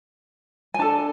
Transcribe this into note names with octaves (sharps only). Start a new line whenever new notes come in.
G#5
D4 A4 A5